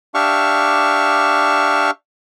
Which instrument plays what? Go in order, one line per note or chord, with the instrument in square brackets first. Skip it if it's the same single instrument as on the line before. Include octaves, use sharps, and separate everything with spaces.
[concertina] D4 G4 E5 F5 C#6